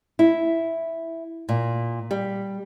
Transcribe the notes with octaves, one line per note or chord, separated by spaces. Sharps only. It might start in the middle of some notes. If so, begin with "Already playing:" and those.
E4
A#2
G3